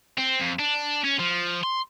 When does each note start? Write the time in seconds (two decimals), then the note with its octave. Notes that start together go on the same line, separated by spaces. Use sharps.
0.18 C4
0.40 F2
0.59 D4
1.04 C#4
1.19 F3
1.63 C6